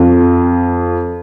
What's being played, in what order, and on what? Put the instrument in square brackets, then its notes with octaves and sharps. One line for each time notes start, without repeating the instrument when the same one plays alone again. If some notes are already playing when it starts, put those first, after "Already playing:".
Already playing: [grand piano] F2